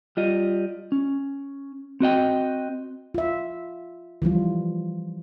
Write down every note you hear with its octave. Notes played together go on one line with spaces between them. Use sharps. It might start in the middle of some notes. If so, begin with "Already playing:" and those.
G3 F4 D#5
C#4
C4 F#4 D#5 G5
F4 E5
E3 F3 G3 F4